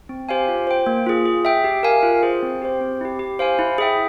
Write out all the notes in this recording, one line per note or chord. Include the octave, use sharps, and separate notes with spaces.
C4
G4 C5 F5 G#5
F4
C5 G5
A#3
F4 G#4
G#4
E5 G5
G4
A#4 F5 G#5
F4
G#4 C5
C4
G4 C5
C4
E4 G4
G4
C5 F5 G#5
E4
G#4 E5 G5